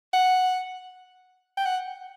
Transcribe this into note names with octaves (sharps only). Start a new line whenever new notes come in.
F#5
G5
F#5